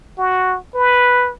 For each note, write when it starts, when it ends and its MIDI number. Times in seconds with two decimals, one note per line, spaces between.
0.18 0.57 66
0.75 1.31 71